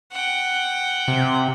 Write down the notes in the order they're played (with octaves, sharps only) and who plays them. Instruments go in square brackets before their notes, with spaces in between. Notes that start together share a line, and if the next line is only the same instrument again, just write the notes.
[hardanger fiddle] F#5 G5
[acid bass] C3